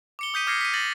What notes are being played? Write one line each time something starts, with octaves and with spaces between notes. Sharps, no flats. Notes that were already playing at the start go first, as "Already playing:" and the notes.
D6 C#7 G7
D#6 G6 B6 D#7
D6 F6 G#6 A#6 C7 C#7
B6 D#7
A6 A#6 F#7